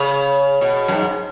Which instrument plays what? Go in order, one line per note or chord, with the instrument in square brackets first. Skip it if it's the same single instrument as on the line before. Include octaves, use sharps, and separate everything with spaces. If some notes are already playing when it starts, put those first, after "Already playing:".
Already playing: [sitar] C#3
B2
F#2
G#2